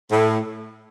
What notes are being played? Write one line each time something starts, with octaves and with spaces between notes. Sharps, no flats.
A2